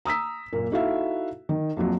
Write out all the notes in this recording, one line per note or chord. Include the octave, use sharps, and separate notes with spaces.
A#5 D#6 E6 B6
F#1 A#2 A#3
D#4 E4 F#4 A4 E5 F5
D#3
A#1 F2 F3 F#3